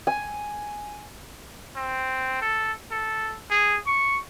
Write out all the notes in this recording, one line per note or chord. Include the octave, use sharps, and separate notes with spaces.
G#5
C4
A4
A4
G#4
C#6